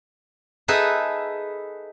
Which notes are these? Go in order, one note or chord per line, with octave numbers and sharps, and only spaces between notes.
D#4 G#4 A4 B4 E5